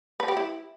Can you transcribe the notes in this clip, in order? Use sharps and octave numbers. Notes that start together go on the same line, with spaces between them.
B4
G4
E4